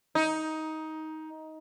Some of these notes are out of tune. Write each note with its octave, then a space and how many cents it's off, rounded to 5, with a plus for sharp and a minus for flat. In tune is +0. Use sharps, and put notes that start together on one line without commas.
D#4 +15